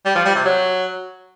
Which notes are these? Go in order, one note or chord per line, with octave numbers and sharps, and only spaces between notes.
G3
F3
G3
C3
F#3